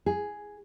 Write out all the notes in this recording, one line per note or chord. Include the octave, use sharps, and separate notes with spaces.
G#4